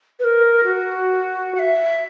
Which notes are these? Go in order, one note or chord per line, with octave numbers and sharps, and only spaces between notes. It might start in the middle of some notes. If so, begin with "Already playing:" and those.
B4
A#4
F#4
F#5
E5